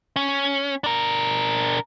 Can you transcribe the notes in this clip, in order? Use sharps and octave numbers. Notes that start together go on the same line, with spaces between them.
C#4
D4 A#4